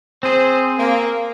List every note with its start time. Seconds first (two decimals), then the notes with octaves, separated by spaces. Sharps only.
0.23 C4 G#4 C5
0.78 A#3